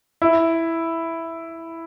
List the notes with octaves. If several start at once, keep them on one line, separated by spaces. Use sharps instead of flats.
E4